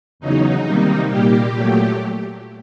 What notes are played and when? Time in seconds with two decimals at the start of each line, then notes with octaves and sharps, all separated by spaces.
0.20 E2 C#3 F#3 D#4
0.64 C3 D#3 G3 A#3
1.08 A#2 G3 A#3 G4
1.51 A#2 F#3 A3